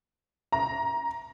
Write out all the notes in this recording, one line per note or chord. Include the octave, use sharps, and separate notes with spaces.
A#5